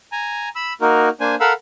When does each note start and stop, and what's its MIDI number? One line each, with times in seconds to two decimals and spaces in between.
0.12 0.49 80
0.12 0.49 82
0.55 0.73 83
0.55 0.73 88
0.81 1.09 58
0.81 1.09 63
0.81 1.09 66
0.81 1.09 70
1.20 1.35 58
1.20 1.35 62
1.20 1.35 72
1.20 1.35 80
1.40 1.53 69
1.40 1.53 70
1.40 1.53 77
1.40 1.53 78
1.40 1.53 83
1.40 1.53 88